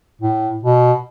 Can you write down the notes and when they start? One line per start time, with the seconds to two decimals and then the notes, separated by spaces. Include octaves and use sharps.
0.21 A2
0.63 B2